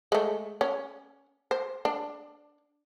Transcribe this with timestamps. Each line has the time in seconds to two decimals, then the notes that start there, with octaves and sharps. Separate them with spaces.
0.12 G#3 A3
0.61 C#4
1.51 C5
1.85 D4